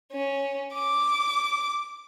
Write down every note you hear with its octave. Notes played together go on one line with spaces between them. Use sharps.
C#4
D6